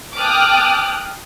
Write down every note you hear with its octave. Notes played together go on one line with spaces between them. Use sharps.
G5 A5 D6 D#6 F6 F#6